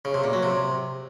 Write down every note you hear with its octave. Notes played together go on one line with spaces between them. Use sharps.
C#3
C3
A#2
F#3
C3